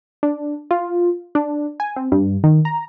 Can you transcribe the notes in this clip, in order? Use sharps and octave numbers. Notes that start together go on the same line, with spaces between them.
D4
F4
D4
G#5
C4
G2
D#3
A#5